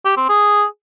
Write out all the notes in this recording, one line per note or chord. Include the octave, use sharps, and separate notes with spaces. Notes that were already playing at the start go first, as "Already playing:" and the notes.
G4
C4
G#4